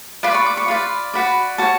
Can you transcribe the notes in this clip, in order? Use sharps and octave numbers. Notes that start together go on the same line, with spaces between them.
F4 B4 D5 D6
C#6
D6
C#6
F4 B4 D5
F#4 B4 D5
F#4 C#5 A5